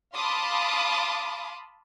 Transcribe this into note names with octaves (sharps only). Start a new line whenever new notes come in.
F5 A5 B5 C6 D6 D#6